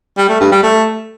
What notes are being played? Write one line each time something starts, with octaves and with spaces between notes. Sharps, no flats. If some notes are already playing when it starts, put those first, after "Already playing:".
G3
A3
G2
G3
A3